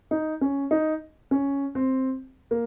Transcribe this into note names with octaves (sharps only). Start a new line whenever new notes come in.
D#4
C#4
D#4
C#4
C4
A#3